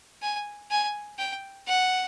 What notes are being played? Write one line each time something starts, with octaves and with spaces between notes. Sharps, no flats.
G#5
G#5
G5
F#5